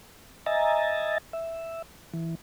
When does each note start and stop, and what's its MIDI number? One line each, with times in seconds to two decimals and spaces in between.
0.46 1.18 75
0.46 1.18 76
0.46 1.18 80
0.46 1.18 82
0.46 1.18 93
1.33 1.82 76
2.14 2.35 52